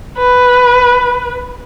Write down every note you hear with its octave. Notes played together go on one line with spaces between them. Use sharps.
B4